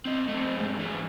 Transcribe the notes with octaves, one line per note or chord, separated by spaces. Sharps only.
C4 D#5
A3 C4
E2 G#2
E3 G#3